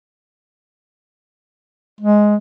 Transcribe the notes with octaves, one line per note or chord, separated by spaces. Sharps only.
G#3